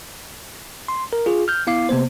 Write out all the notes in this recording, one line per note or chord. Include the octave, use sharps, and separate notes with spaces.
C6
A#4
F4 G#4
F6 G6
B3 E4 F5 D6 C7
C3 A#3 B3 C5